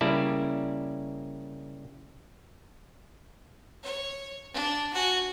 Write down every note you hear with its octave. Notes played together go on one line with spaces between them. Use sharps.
C#3 G3 A#3 E4 D5 A5
C#5
D4
F#4 G#5